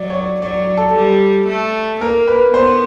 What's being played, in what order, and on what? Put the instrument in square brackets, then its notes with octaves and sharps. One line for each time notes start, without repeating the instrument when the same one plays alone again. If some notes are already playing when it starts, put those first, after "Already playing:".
Already playing: [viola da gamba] F#3 [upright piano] D5
[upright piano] C#5
D5
[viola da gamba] F#3 [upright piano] D5
[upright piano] D5
A4
[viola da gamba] G3
A3
[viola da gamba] A#3 [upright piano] A#4
[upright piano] B4
[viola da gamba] B3 [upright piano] C5